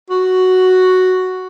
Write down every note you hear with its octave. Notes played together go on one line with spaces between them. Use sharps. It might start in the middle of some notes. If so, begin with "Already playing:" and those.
F#4